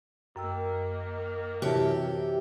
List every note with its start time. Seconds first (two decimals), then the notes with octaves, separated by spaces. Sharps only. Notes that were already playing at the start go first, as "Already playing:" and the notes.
0.36 F#2 D#3 A#3 G5 E6
1.62 C3 E3 F#4 G4 C#5 A5